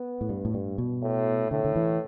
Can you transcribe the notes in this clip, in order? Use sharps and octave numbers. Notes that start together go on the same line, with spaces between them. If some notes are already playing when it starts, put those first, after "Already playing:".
Already playing: B3
A2
G2
A2
G2
B2
A2
A2 D3
D3
E3